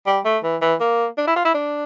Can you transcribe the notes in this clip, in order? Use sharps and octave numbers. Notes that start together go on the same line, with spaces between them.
G3
A3
E3
E3
A#3
D4
E4
F4
E4
D4